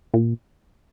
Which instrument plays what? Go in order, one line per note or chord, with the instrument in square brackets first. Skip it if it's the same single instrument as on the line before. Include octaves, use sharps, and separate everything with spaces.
[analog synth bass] A#2